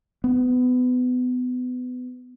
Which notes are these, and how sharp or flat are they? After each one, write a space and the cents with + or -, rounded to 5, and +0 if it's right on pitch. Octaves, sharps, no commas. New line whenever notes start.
B3 +25